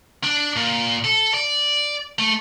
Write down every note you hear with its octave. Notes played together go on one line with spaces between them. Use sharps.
D4
A#2
A4
D5
A3